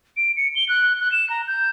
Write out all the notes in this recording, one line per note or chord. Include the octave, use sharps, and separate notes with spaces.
D7
C#7
G7
F#6
F#6
E7
A#5
G6